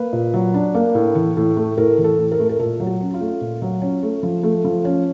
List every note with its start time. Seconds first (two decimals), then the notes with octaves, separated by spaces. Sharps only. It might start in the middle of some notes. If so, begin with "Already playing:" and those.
Already playing: A#3 B4
0.13 A#2
0.34 F#3
0.54 D4
0.75 A#3
0.95 A2
1.15 E3
1.37 A2
1.57 A3
1.77 A2 A#4
1.98 E3
2.04 A4
2.19 A2
2.32 A#4
2.39 A3
2.49 A#4
2.59 A#2 A4
2.80 F#3
2.86 F#4
3.01 C#4
3.14 F4
3.21 A3
3.41 A#2
3.62 F#3
3.82 C#4
4.03 A3
4.23 F3
4.43 A3
4.64 F3
4.84 C#4